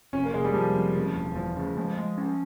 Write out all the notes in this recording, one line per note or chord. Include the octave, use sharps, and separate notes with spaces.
F1 C#4
A#3
F1 G#3
G3
F1 F3
F2
C#3
E1
E2 F3
C#3
F3 G#3
G#3
C#4